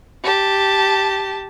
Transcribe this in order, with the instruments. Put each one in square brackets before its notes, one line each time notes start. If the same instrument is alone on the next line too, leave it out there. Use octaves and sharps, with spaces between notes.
[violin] G4 A5